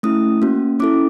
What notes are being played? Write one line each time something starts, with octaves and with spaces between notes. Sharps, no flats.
A3 C#4 E4 D#6
A#3 C#4 F#4
C#4 E4 A4 D6